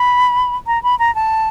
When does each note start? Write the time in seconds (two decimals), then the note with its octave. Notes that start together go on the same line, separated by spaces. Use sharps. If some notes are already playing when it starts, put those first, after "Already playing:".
Already playing: B5
0.67 A#5
0.83 B5
0.99 A#5
1.15 A5